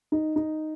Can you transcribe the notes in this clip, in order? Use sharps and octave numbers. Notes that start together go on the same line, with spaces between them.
D#4
D#4